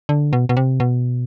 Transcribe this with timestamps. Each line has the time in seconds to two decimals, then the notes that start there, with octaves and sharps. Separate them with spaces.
0.09 D3
0.33 B2
0.49 B2
0.57 C3
0.80 B2